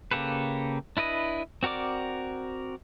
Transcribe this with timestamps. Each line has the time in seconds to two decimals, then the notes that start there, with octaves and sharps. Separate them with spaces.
0.11 C#3 A#3 G4 A4 B4
0.97 D4 E4 B4 D#5
1.63 C4 F#4 A#4 D5 D6